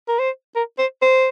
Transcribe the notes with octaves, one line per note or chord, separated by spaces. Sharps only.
A#4
C5
A#4
C5
C5